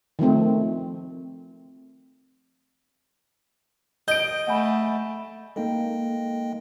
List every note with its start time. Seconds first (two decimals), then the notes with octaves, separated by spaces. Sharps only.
0.19 D#3 F3 A3 C4
4.08 D#5 G6 D7
4.47 A3 F#5 G#5 B5
5.56 G#3 A#3 D#4 A4 D#5 G5